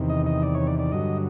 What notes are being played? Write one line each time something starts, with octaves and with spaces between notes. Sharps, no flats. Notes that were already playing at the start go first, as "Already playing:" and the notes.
Already playing: E2 C3 D#3
D#5
D#5
D5
C#5
D5
D5
G2 D3 F#3 D#5